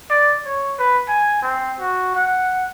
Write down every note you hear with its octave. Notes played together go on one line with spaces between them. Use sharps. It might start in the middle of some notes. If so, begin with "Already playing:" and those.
D5
C#5
B4
G#5
C4
F#4
F#5